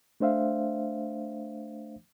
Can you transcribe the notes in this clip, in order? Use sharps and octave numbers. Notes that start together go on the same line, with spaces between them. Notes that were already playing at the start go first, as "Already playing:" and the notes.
A3 D4 C5 E5 F5